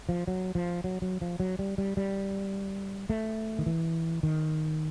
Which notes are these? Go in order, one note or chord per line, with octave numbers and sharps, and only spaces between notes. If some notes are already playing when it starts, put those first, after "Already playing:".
F3
F#3
F3
F#3
F#3
F3
F#3
G3
G3
G3
A3
D#3
E3
D#3